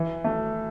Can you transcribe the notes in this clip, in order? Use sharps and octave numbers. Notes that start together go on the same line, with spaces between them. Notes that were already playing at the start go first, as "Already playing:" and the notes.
Already playing: E3
A3